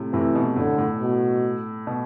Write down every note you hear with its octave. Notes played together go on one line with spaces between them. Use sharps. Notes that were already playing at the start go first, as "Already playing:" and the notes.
Already playing: A2 C3
A2 C3 E3
B2
A2 D3
A2
B2
B2